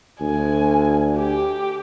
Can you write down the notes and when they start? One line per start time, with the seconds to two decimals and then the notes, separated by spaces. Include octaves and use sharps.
0.21 D2 G#5
1.16 G4